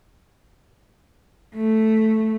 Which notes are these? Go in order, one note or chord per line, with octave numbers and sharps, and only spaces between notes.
A3